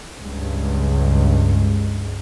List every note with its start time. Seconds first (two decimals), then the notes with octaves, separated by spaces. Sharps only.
0.21 C#2 G2 G#3